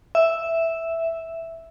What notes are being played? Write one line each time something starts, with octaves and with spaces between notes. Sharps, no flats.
E5